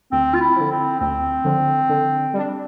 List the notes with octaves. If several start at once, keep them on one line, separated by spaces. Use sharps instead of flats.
D2 C4
F4
E4
D3 F3
C4
D2 C4
D3 F3
D3
G3 D4